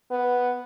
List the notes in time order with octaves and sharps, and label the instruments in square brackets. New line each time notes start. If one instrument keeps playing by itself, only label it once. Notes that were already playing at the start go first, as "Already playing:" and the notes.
[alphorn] B3